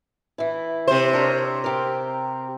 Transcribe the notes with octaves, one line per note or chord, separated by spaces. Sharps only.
E3 E4
C3 C5
D4 A#4 C#5
G4 A#4